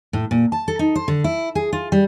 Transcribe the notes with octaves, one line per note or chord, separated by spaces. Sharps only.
A2
A#2
A5
A4
D#4
C5
D3
E4
G#4
F4
G3